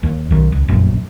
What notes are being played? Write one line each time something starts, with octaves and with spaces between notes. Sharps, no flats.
D#2
B1 D#3
C#2
F1 A#1 F#2